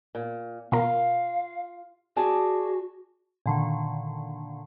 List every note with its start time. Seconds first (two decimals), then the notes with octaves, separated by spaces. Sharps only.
0.15 A#2
0.72 B2 F4 A#4 F5
2.17 F#4 G#4 D5 A5
3.46 A#2 D3 D#3